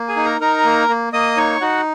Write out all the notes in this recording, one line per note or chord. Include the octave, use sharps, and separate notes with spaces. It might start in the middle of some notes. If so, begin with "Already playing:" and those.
Already playing: A#3
G#4 G#5
D#4
A#4 A#5
D#4 A#4 A#5
A#3
A#3
A#3 D#5 D#6
D#4 C#5 C#6
D#4 F#4 F#5